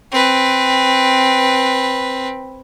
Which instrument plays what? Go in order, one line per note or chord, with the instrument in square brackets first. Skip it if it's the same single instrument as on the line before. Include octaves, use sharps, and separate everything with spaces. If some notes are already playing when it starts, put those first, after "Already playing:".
[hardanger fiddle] C4 B4